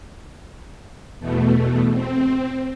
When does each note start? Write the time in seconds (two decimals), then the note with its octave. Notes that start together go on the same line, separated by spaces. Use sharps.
1.20 E2 B2 A3
1.93 C4